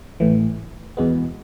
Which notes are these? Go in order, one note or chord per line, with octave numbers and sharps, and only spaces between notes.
A1 A2 E3
E2 B2 G#3 B3